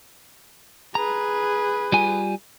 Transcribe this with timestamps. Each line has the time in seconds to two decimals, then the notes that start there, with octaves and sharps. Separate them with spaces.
0.95 G#4 B4 A#5
1.92 G3 F4 G#5